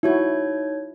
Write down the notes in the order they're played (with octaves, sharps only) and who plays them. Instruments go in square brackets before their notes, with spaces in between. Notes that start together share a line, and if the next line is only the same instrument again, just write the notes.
[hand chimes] D#4 C#5 G#6 [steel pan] E4 F#4